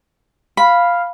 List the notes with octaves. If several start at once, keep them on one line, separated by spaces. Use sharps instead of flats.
F5 B5